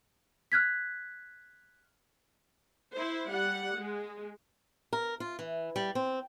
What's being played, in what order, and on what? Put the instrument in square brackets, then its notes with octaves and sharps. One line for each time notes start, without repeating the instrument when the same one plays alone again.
[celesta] F6 F#6 G#6 B6
[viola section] E4 C5
G3 F#5
G#3
[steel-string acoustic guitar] A#4
F4
E3
G3
C4